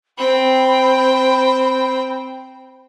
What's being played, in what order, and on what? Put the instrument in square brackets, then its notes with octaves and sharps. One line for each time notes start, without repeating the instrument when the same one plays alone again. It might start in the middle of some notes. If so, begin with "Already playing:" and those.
[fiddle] C4 G5 [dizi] B5